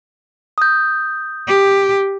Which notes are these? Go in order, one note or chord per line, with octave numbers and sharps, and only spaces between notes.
D#6 G6
G4